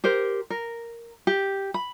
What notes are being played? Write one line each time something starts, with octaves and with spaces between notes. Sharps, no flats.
G4 A#4 C5
A#4
G4
B5